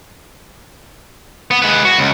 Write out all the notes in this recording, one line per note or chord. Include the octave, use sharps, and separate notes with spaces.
B3
G#3 B4
F#4
C#2